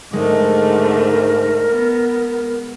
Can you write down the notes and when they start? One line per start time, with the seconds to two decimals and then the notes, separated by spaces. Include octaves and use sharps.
0.13 G#2 D3 G#3 A3 A#4
1.70 B3